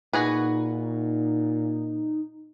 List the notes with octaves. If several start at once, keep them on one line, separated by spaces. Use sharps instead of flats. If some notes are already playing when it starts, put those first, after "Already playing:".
A#2 D#4 F#4 G#4 B4